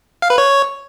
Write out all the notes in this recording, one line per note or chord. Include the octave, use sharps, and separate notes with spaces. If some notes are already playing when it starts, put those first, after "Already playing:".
F5
B4
C#5